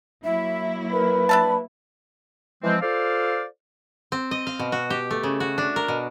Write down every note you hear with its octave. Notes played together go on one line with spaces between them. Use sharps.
F#3 A#3 E4 E5
A#4 B4
D4 E5 A5 B5
E3 F3 G#3 C4
F4 A4 C5 D5 F5
C4
D#5
F5
B2
F#4
G4
A3
C#3
F#4
D4
A#4
B2